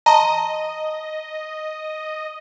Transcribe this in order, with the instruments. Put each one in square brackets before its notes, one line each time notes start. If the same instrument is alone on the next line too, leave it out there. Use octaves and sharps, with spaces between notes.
[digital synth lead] D#5 [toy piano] A5 A#5 C6